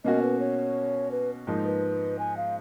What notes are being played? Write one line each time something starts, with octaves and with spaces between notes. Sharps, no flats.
B2 A#3 C#4 F#4 D#5
B4
C#5
B4
G#2 F3 A#3 D#4
B4
G#5
F5